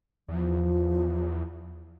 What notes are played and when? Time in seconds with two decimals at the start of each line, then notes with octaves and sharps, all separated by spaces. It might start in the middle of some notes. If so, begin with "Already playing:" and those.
0.28 E2 F3